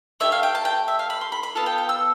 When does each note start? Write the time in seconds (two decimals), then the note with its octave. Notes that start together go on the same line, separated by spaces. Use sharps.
0.20 A3 E4 G4 E5
0.32 F5
0.43 G5
0.55 A5
0.65 G5
0.88 E5
0.99 F5
1.10 B5
1.21 C6
1.32 B5
1.43 B5
1.55 B3 F4 A4 A5
1.66 G5
1.78 G5
1.89 E6